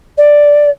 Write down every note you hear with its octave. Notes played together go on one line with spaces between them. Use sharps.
D5